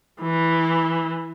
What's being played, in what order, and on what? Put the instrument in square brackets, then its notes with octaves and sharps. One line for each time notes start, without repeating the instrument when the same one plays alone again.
[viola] E3